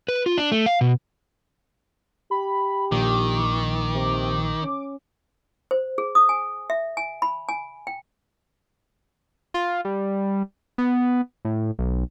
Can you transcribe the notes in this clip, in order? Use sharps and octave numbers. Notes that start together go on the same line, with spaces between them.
B4
F4
D4
A3
F5
B2
G4 B5
A#1 A#2 D#3 D6
C3
C#4
C5
G#4
D#6
G#5
E5
G#5
B5
G#5
G5
F4
G3
B3
A2
B1